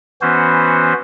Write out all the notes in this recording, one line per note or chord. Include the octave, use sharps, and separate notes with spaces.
E3 B3 C#4 F#4 C5